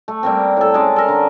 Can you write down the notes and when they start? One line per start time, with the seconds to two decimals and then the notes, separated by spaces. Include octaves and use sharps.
0.08 A3
0.23 G3 A#3 C4
0.57 A2 A4
0.74 G#3 C#4 D5
0.96 A4 A#4
1.08 D3